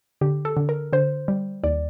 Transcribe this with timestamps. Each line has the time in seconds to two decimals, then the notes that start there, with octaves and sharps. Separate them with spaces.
0.21 D3 G4
0.45 A4
0.57 D3
0.69 A#4
0.93 D3 C5
1.28 G3
1.63 D#2 D5